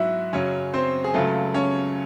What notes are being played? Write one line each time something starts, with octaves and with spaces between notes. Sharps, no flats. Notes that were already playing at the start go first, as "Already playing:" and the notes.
Already playing: G#2 F#3 E4 F#4 E5
F#2 C#3 F#3 C#4 C#5
C4 C5
G#4
C#2 C#3 F#3 A3 A4
C#4 C#5